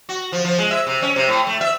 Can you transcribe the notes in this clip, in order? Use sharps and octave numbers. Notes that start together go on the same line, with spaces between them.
F#4
F3
F3
G#3
E5
C3
C#4
C3
A2
A3
E5